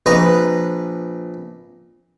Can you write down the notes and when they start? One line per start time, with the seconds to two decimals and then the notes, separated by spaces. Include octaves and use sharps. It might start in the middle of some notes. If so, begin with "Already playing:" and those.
0.06 A#1 B4 D#5 A#5